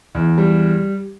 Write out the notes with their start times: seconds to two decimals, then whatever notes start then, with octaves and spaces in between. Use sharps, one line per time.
0.15 E2
0.38 G3